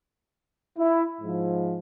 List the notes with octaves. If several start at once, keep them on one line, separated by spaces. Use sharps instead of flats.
E4
G#2 F3